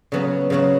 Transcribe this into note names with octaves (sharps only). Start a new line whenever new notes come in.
C#3 F#3 B3 F#4
C#3 F#3 B3 F#4